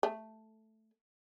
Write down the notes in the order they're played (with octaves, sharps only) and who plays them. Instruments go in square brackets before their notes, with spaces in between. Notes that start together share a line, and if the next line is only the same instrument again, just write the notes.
[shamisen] A3